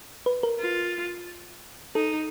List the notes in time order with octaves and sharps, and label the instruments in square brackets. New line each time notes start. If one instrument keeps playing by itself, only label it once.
[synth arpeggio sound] B4
A#4
[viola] F4
[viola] D#4 [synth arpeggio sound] A4